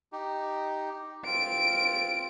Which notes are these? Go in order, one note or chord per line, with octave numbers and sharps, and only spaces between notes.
D#4 G4
C4 F4 D7